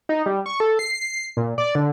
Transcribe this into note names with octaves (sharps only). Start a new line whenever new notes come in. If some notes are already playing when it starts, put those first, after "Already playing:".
D#4
G3
C#6
A4
C7
A#2
D5
D3